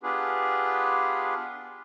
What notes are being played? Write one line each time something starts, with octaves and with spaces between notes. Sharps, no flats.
B3 D4 F4 G4 G#4 B4